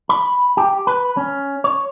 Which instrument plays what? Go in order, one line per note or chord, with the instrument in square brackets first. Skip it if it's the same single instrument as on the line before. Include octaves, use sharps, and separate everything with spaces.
[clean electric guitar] B5
G4
B4
C#4
C#5